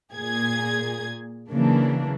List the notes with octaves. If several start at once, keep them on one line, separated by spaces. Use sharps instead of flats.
A#2 G#4 G#6
C#3 E3 F#3 A#3 D4